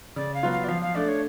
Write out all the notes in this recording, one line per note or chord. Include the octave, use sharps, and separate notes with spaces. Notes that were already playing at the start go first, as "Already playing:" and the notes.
C#3 D5
F5
F#3 B3 F4
F5
D5
F3 F5
F5
A3 D4 D5
C#5